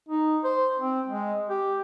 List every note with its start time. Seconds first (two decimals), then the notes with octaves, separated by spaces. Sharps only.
0.09 D#4
0.44 C5
0.79 C4
1.08 G#3
1.49 G4